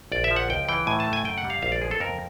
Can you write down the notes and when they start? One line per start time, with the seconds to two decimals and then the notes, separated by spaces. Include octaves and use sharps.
0.12 A#1 D5
0.24 E5
0.31 F3
0.36 F#5
0.50 C#2 G5
0.69 E3 G5
0.87 A2 G#5
1.00 A5
1.07 A3
1.13 G#5
1.25 F#2 G5
1.38 F#5
1.44 G3
1.50 F5
1.62 A#1 F5
1.72 D5
1.82 F3 G#4
1.91 A4
2.00 F2 A#4